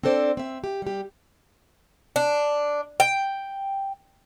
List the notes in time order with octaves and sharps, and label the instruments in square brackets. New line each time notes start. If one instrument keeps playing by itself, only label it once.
[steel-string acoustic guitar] C4 D4 A4 C5 D5
C4 E5
G4
G3 G4
[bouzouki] D4
G5